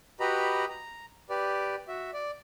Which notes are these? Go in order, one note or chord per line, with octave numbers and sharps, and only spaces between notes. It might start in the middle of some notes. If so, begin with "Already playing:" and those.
F#4 G4 B4 D#5 A#5 B5
A#5
G4 B4 D5
F#4 E5
D5